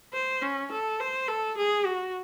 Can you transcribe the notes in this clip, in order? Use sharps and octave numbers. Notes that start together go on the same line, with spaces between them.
C5
C#4
A4
C5
A4
G#4
F#4